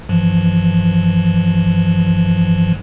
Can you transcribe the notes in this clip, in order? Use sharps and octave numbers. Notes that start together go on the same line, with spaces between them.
G2 E3 F3